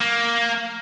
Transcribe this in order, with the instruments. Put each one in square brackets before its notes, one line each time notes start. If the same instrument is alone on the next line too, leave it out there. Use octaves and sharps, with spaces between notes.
[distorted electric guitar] A#3